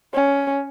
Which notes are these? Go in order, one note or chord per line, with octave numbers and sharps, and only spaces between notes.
C#4